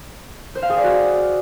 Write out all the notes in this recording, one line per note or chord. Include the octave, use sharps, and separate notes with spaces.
C5
F5
G#4
D5
F#4